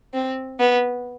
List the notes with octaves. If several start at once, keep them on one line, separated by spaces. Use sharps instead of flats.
C4
B3